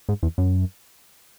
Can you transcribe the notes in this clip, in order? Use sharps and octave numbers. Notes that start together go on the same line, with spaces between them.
G#2
E2
F#2